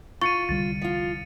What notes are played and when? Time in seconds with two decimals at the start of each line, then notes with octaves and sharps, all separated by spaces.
0.21 F4 C#6 A6 C#7 D#7
0.49 C2 D3 G3 A6
0.82 F3 F4